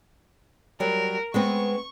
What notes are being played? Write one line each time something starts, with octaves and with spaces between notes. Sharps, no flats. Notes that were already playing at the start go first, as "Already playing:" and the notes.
F#3 G3 A#4
G#3 B3 C4 C#6